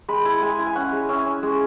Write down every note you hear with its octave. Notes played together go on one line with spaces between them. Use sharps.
G#3 B5
E4
G#3 G#5
E4
G#5
C#4 F#5
G#3
C#4 E5
C#4
G#3 G#4